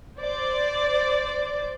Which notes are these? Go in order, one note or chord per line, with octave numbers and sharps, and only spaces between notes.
C5 D5